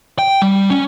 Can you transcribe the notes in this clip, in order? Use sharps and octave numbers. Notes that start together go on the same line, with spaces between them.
G5
G3
C#4